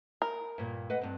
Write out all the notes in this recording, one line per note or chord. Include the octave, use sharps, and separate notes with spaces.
A#4
G2 A#2
B4 D#5 F#5
G2 C4